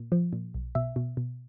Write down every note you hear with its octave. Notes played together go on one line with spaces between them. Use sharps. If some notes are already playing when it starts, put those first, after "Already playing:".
Already playing: A#2
F3
A#2
B1
B2 E5
B2
B2